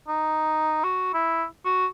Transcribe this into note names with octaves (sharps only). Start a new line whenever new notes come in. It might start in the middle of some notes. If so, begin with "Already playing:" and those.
D#4
F#4
E4
F#4